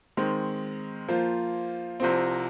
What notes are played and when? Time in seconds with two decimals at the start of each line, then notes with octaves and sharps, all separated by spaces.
0.17 D#3 G#3 C4
1.08 F3 A#3 F4 C5
2.00 C2 C3 F3 C4